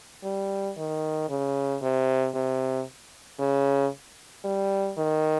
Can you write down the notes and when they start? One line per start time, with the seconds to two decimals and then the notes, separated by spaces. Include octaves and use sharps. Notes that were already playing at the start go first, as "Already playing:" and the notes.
0.24 G3
0.77 D#3
1.29 C#3
1.82 C3
2.35 C3
3.39 C#3
4.45 G3
4.97 D#3